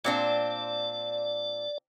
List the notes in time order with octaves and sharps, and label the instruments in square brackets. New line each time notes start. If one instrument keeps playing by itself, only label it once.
[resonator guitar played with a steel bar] A#2 C4 D4 [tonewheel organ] D5